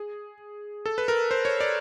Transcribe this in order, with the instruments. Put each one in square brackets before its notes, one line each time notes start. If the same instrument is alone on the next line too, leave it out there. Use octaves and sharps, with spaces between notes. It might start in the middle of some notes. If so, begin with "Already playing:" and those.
Already playing: [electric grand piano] G#4
A4
B4
A#4
C5
C#5
D5